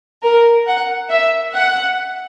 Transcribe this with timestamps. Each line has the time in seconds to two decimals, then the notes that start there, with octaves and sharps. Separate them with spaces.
0.24 A#4
0.68 F#5
1.10 E5
1.54 F#5